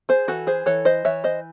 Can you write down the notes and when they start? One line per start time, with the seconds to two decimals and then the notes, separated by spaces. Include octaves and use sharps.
0.09 G#4 C5
0.28 E3 F#4 A4
0.47 G#4 C5
0.66 E3 A4 C#5
0.85 C5 D#5
1.05 E3 C#5 E5
1.24 C5 D#5